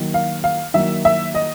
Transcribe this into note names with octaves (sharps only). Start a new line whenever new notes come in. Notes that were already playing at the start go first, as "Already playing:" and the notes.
Already playing: D#3 F#3 A#3
F5
F5
D#3 F#3 A#3 E5
E5
D#5